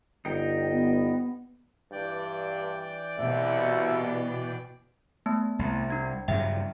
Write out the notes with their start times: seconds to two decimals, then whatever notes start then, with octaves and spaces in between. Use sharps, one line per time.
0.25 G1 D#4 G5
0.71 B3
1.92 G2 E3 D5 G5
3.18 C2 B2 E5
5.26 A3 B3 A5
5.59 C2
5.90 D4 G#6
6.28 G2 C#3 F#3 E5 G5